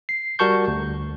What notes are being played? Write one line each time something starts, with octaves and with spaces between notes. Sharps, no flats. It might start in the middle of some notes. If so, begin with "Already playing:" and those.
C7
G3 F#4 A#4 A5 C#6 G6
D2